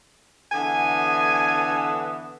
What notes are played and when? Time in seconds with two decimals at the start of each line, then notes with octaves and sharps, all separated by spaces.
0.52 D3 E3 B3 G#5